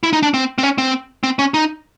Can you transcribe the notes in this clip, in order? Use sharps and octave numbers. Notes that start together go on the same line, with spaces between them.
E4
D#4
D4
C4
C4
C#4
C4
C4
C#4
D#4